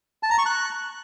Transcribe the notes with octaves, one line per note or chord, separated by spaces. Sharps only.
A5
A#5
C#6
F#6